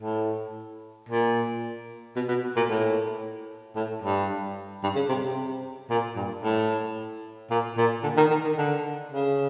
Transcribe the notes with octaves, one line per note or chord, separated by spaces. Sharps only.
A2
A#2
B2
B2
A#2
A2
A2
G2
G2
C#3
C3
C3
A#2
G2
A2
A#2
A#2
D3
D#3
D#3
D#3
D3
C#3